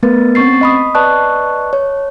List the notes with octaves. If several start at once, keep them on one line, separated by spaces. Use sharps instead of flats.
A3 B3 A#4 B4 A6
C4 C#4 C#6 A6 C7
D#5 B5 D#6
B4 D5 D#5 A5 C#6 F#6
C#5